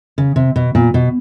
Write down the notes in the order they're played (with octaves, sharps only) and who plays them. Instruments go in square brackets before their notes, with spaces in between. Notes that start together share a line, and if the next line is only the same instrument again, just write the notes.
[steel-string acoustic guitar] C#3
C3
B2
A#2
B2